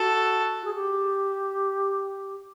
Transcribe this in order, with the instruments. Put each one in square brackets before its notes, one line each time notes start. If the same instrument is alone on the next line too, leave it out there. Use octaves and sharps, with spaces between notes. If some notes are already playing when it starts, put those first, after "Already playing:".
Already playing: [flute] F#4 [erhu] A4
[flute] G#4
G4